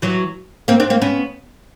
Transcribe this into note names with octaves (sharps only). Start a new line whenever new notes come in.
E3 F#3
A#3 C4
C4 D4
A#3 C4
B3 C#4